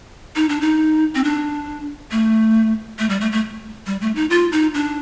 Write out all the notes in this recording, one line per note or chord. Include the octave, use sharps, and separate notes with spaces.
D#4
D4
D#4
C4
D4
A3
A3
G3
A3
A3
G3
A3
D#4
F4
D#4
D4